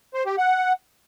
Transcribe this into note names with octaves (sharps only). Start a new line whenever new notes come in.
C5
G4
F#5